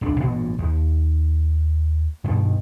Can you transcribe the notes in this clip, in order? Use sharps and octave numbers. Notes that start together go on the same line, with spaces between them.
D#1 C2 D4
A1 G2 A#2
D#2
G2 B2 D#3 G3